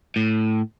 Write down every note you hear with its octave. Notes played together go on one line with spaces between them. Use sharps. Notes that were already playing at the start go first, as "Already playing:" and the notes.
A2